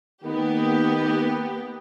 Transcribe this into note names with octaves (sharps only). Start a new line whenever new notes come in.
D#3 A#3 B3 G4